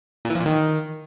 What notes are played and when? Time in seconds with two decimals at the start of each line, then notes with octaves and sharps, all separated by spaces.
0.25 A#2
0.30 E3
0.35 F3
0.40 A#2
0.45 D#3